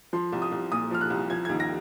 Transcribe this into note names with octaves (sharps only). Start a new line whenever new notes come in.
F3 C6
C2
D#6
C2
A#2 D#6
F3 F6
F#6
C2
F3 G#6
D#2 G#6
A#6